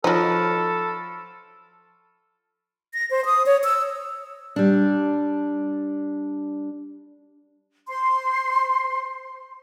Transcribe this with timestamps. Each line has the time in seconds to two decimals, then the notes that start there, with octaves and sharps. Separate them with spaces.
0.04 F3 F#3 D#4 A4 B5 C#6 F6
2.94 A#6
3.11 C5
3.25 D#6
3.46 C#5
3.64 E6
4.56 G3 D4
7.88 C5 C6